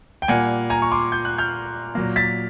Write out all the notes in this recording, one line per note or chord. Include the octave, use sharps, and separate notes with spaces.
G5
A#2 G3 A#3 F#5 G#5
G#5 A#5
C#6
C6 D6
G6
F#6
F6 G6
A#2 F#3 A#3
A6 B6